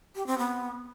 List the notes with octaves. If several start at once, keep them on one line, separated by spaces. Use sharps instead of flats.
G4
C4
B3